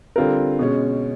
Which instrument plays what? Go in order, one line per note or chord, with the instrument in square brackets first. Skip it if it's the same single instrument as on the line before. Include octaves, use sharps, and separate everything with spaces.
[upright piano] D3 G3 C4 F4 A#4
B2 G#3 C#4